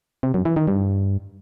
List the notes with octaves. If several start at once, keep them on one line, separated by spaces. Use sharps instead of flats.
C3
F#2
E3
D#3
G2